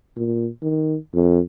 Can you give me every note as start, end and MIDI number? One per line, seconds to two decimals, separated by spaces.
0.16 0.49 46
0.62 0.96 51
1.14 1.40 41